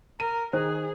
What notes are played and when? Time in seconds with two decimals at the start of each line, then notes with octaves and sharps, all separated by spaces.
0.20 A#4 D#7
0.53 D#3 G#4 C5